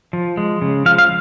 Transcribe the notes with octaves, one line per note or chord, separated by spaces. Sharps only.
F3
G#3
C#3
F3 F5
F5